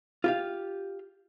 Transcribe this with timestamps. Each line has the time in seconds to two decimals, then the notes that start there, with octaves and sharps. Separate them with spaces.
0.24 F4 G4 F5